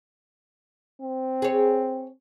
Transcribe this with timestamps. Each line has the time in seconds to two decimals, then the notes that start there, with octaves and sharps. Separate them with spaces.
1.02 C4
1.42 G#4 C#5